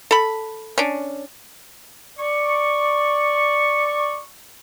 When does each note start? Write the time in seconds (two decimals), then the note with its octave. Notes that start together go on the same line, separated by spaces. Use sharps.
0.11 A4 B5
0.78 C#4 D4
2.20 D5 C#6